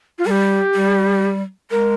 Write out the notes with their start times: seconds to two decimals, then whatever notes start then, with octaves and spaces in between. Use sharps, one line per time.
0.19 F4
0.26 G3 A#4
0.31 G4
0.75 G3
1.71 G#3 A#4